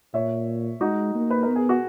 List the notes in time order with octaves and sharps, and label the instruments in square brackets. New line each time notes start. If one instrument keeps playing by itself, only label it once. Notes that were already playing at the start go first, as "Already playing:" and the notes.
[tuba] A#2 [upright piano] C#5 E5
[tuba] G#3 [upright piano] D#4 F#4
[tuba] A#3
[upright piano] B4
A#4
[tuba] B3
[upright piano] G#4
F#4